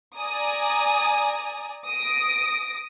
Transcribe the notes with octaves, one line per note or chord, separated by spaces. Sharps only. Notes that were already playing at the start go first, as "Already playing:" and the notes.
D5 G#5 A#5 D#6
D#6 A#6 D7